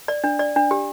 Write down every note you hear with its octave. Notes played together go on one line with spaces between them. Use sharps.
D5
D4
D5
D4
G4